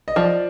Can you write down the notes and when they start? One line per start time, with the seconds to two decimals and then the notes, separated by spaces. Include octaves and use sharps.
0.08 D#5
0.16 F3 D5